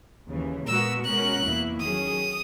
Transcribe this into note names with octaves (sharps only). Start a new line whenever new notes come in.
D#2 C#3 E3
A#2 G#3 B3 F#4 A#4 E6
B2 G#3 C#4 F#4 A#4 F#6
E2 B2 A#3 E4
D#3 F#3 C#4 G#4 D#6